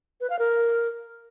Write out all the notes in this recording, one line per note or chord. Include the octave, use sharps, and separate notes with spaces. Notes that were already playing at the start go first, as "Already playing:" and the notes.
B4
F5
A#4